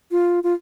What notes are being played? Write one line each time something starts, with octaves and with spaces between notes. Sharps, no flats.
F4
F4